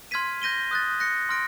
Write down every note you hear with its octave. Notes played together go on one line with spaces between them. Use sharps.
C6 F6 G#6 B6 D#7
G6 A#6 D#7 G7
D#6 F#6 A6
F#6 A#6 C#7
C6 F6 A#6 D7